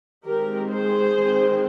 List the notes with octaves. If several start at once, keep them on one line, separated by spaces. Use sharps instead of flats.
D#3 G#3 C4 G4 A#4
G#4 C5
D#3 G#3 C4